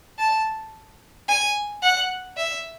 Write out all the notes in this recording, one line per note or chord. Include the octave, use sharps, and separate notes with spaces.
A5
G#5
F#5
E5